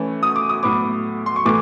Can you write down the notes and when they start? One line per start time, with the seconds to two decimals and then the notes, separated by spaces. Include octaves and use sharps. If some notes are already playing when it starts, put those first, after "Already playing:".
Already playing: E3 A3 C#4
0.23 D#6
0.36 D6
0.49 D#6
0.63 A2 F#3 B3 D6
1.26 C6
1.36 C#6
1.45 A2 E3 A3 D6